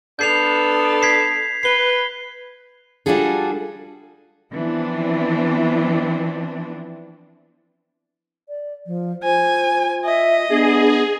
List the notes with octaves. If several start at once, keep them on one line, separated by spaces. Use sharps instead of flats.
B3 D4 A4 G6 C7 F7
G#6 B6 C7
B4 C7 G7
G3 D4 F4 F#4 G#4 A4
E3 F3 B3 C4 D4
D5
F3
F4 C5 G#5
D#5 E5
B3 D4 G#4